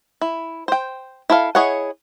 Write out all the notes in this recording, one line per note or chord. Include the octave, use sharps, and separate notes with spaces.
E4
C5 G5
E4 A4 F5
E4 G#4 C#5 D#5 F#5